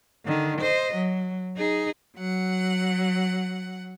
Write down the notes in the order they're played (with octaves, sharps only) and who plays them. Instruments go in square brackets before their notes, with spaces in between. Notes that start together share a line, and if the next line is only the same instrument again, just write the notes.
[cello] D3 D#3
C5 D#5
F#3
D#4 G#4
[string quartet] F#3 F#5